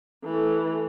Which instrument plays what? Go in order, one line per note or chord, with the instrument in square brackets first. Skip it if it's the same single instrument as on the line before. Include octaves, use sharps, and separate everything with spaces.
[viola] E3 A3